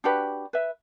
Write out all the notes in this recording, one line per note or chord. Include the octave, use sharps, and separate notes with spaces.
D4 F#4 G4 B4
B4 E5